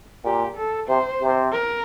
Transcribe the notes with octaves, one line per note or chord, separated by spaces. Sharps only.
A#2 G4
A4
C3 C5
C3
A#4